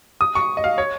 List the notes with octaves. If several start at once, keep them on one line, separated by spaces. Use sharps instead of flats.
D#6
C#6
D#5
F5
C#5